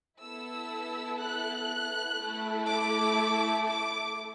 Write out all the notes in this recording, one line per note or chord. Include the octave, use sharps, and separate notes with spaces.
B3 E4 A4 E6
F#6
A3 E4 A4
D6
D6